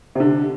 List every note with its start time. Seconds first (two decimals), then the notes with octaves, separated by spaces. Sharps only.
0.15 C3
0.20 D3